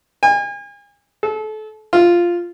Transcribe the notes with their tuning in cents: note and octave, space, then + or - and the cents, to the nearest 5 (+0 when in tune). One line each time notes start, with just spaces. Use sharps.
G#5 -40
A4 -30
F4 -5